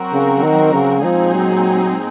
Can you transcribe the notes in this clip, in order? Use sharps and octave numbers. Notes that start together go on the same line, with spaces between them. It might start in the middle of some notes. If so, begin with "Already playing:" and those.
Already playing: F#3 C4 F#4 A#4
C#3
D#3
C#3
A#2 F3 G#3 C4 D#4 G#4
F#3